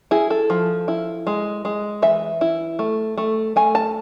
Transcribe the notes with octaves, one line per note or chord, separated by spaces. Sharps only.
E4 G#4
A4
F3
E4
G#3
G#3
E3 E5
E4
A3
A3
A3 G#5
A5